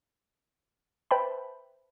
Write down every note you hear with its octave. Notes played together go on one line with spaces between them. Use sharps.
B4 C5 E5 G5 A5 B5